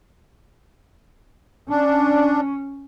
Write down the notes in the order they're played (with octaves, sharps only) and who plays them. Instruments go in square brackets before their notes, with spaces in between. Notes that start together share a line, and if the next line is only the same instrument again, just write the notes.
[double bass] C#4 [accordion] D4